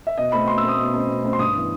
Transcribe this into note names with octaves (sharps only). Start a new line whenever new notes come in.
E5
B2 D#5
A3 C4 B5
B2 C6
E6
A3 C4 D#6
B2
A3 C4
B2
A3 C4
C6
G2 D#6
E3 B3